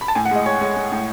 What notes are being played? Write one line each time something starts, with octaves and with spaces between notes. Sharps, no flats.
B5
A5
A2 G#5
F#5
G#3 D#5
G#3 C#5
G#3 C#5
G#3
A2